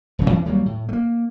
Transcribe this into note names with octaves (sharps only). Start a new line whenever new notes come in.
D#1 G2 C#3 F#3
F2 E3 C#4 D4
D#2 F#3 G3 A#3
A2
A3 A#3